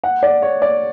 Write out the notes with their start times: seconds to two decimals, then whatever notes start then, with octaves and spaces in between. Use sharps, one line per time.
0.04 F#5
0.23 D5
0.42 C#5
0.62 D5